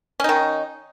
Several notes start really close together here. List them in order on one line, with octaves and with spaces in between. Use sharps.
C#4 D#4 D#3